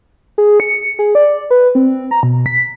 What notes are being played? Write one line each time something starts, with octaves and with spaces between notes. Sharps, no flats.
G#4
C#7
G#4
D5
B4
C4
A#5
B2
B6